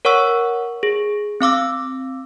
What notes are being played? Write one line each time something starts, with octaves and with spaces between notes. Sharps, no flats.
A#4 C#5 F#5 C#6 E6
G#4
C4 F5 D6 E6